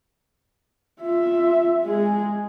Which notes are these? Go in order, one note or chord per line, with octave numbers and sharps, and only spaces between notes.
F4 E5
G#3 G#4